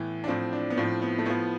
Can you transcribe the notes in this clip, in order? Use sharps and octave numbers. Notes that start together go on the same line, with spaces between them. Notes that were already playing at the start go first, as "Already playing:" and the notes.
Already playing: A2 E3 B3
D4
A2 F3 C4
D4
B3
A2 F3 C4
B3
A3
A2 F3 B3